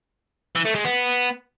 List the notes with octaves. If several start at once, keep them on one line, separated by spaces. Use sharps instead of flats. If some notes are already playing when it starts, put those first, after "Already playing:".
E3
A3
G#3
B3